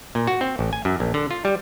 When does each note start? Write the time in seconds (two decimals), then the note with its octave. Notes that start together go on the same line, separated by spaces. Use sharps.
0.15 A#2
0.27 F#4
0.41 C4
0.59 A1
0.73 G#5
0.85 F#2
1.00 A#1
1.14 D3
1.31 F4
1.45 G3